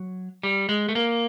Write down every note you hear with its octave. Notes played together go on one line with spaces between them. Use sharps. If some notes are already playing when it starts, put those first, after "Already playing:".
Already playing: F#3
G3
G#3
A3
A#3